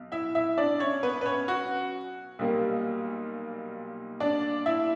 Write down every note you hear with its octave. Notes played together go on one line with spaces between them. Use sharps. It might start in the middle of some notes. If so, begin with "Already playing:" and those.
Already playing: B1
E4 E5
E4 E5
D4 D5
C#4 C#5
B3 B4
B4
C#4 C#5
F#4
B1 A#2 G3 A#3
D4 D5
E4 E5